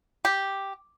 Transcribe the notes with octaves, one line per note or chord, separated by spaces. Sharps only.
G4